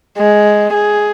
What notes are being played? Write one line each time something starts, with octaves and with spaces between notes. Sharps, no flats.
G#3
G#4